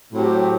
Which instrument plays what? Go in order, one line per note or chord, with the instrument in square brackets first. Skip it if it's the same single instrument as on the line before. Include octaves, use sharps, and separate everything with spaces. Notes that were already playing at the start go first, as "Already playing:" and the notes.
[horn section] A2 F#3 C4 G4